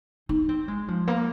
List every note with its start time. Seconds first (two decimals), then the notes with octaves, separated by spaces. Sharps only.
0.29 D#4
0.49 C4
0.68 G#3
0.88 F3
1.07 A#3